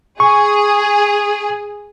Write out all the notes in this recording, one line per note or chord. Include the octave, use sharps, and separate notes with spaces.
G#4 C#6